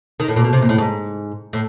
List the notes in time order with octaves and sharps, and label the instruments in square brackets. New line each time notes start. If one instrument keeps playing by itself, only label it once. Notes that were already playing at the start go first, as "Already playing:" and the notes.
[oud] D#3
A2
A#2
B2
C3
A#2
A2
G#2
A2